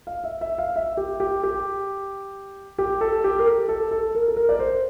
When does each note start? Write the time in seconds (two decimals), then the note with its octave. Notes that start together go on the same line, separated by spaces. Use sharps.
0.07 F5
0.24 E5
0.41 E5
0.58 F5
0.76 E5
0.97 G4
1.20 G4
1.43 G4
2.78 G4
3.01 A4
3.24 G4
3.39 A#4
3.46 A4
3.68 A4
3.91 A4
4.15 A#4
4.28 A4
4.36 A#4
4.49 D5
4.59 C5